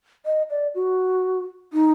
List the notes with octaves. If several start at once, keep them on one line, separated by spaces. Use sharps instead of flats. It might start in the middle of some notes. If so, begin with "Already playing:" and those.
D#5
D5
F#4
D#4